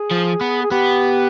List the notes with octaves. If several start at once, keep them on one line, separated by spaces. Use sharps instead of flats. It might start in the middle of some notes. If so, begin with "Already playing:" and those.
Already playing: G#4
F3
B3
G#4
B3 G4